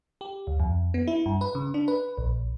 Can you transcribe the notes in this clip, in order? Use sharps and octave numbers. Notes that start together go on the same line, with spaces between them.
G4
D2
F2
B3
E4
G2
B4
C#3
D4
B4
A#1